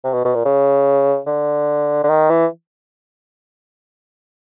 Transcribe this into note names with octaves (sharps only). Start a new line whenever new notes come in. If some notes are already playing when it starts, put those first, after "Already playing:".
C3
B2
B2
A#2
C#3
D3
D3
D#3
E3